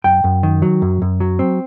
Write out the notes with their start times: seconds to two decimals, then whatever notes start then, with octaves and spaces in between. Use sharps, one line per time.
0.04 F#2 G5
0.24 F#2
0.43 D#3
0.62 F#3
0.82 F#2
1.02 F#2
1.20 F#3
1.39 C4